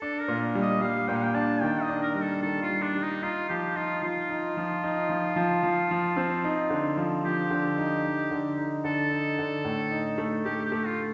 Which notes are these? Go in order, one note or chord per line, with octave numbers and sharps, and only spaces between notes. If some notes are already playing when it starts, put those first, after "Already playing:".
D4 A4
A#4
A#2
G3
D#5
G3 F5
A#2 G5
F5
G5
D4 A5
D#3 G5
D#5
D4
A#4
G3 A#4
A4
D#3 A4
F4
G3
D4
G3
D#4
D#4 F4
F3 G4
D#4 F4
F3 F4
D#4
F3
D#4
F3
F3
F3
F3
C4
D#4
D3
F3
F3 G4
D3
D#4
D#4
D3
D#4
D3 A4
D#4
D3
A2
D#4
A3
A3 G4
G4
A3
F4